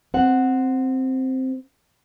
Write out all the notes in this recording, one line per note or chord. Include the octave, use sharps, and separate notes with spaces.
C4 F#5